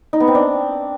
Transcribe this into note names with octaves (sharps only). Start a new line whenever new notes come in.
D#4
B3
C4
D4